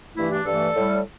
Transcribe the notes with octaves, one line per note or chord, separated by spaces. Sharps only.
G2 E3 A3 E4
D4 G4
G2 E3 A3 A4 D5
A2 G3